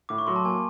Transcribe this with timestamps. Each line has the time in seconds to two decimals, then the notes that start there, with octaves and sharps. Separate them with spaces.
0.09 A2 D6
0.18 C#6
0.27 F#3 C6
0.36 A5
0.45 A#3 G#5